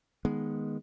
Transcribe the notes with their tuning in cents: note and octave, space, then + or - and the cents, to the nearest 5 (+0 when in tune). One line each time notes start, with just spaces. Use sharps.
D#3 +0 G#3 +0 B3 -15